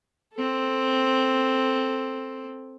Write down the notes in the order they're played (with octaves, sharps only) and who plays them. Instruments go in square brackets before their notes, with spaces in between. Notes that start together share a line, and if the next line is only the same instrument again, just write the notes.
[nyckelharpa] C4 A4